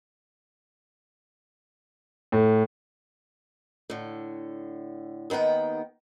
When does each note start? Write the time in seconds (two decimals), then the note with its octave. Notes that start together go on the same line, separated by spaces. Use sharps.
2.32 A2
3.90 A2 D3
5.30 D#2 D#3 B3 F#5 G5